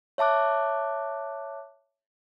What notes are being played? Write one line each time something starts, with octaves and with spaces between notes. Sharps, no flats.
C#5 E5 A5 D6 F#6